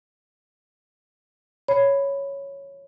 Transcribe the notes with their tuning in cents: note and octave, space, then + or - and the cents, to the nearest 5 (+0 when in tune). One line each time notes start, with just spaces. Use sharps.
C#5 +0 B5 +5